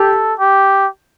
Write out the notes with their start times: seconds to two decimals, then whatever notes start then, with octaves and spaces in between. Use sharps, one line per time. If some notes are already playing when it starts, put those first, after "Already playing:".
Already playing: G4 A4
0.39 G4